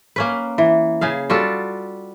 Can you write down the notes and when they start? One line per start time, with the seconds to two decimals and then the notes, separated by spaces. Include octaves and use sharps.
0.16 A#3 C#4 B4
0.58 E3
1.01 C#3 G#4 F5
1.30 G3 F4 F#4 A4